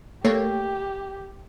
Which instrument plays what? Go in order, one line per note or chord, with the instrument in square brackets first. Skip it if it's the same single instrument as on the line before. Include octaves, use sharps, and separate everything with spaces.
[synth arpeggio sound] A3 A#3 C#5 [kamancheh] G4